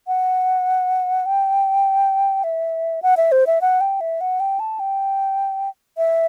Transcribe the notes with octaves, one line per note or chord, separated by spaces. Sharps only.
F#5
G5
E5
F#5
E5
C5
E5
F#5
G5
E5
F#5
G5
A5
G5
E5